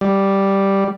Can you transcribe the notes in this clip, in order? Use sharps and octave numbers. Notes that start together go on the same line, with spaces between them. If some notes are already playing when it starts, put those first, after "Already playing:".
G3